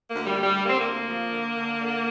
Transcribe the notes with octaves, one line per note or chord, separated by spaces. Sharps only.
A#3
D2
G3
D2 G3
D3 A#3
C4
A#3
D2
F3
D3
D3
D3